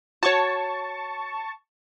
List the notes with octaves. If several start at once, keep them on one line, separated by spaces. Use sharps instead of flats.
F#4 C#5 A5 C#6